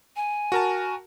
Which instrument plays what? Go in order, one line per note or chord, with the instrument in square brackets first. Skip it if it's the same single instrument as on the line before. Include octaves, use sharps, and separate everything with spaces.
[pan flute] G#5
[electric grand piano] F#4 A#4 A5